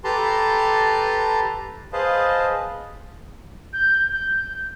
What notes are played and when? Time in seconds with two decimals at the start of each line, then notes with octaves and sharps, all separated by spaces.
0.04 G4 A4 B4 A5 A#5 C6
1.93 G#4 B4 C5 D#5 F5 A5
3.73 G6
4.12 G6